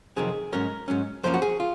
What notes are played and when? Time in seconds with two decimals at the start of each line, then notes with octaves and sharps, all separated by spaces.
0.16 F2 C3 D#3 F#3 C4 G#4
0.53 G#2 F#3 C#4 A#4
0.88 G#2 F#3 C#4
1.23 F#2 F3 A#3 C#4 C5
1.34 F#4
1.42 G#4
1.60 F4